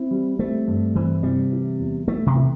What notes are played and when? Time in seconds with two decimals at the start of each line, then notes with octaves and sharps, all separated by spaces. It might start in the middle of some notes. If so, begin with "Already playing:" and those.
Already playing: C4 E4
0.11 G3
0.39 A3 C4
0.68 G2
0.95 E3 C4
1.23 C3 G3
1.52 E3
1.79 E2
2.08 A3 E4
2.26 C3
2.36 E3